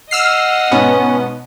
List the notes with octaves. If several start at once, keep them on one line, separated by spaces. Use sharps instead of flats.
D#5 F#5 E6 F6 C7
G#2 B2 B3 C#4